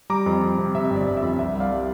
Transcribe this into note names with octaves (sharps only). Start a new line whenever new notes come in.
G3 A#5 D6
F2
F2
C3
C3 E5
G1
D5
G1
E5
F2
C2 E5
C2 D5 F5
G3